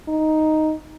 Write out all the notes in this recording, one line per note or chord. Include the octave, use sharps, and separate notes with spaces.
D#4